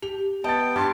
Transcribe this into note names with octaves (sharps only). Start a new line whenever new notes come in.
G4 F7
B3 D#5 G5 A5 A6
G2 G4 A5 C6 D6